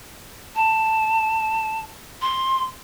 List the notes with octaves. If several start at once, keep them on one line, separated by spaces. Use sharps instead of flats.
A5
C6